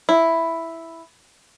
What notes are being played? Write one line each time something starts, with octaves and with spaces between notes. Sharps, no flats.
E4